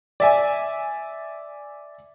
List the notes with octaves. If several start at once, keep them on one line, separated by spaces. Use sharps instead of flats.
D5 E5 G#5